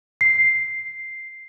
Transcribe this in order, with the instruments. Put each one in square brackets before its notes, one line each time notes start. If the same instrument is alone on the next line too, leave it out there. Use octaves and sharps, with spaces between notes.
[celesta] C7